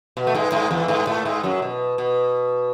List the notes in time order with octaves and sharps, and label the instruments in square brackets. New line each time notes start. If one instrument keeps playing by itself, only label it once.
[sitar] B2
A3
G#2 G#3
G#2 G#3
E2 E3
G#2 G#3
A2 A3
G#2 G#3
F#2 F#3
B2
B2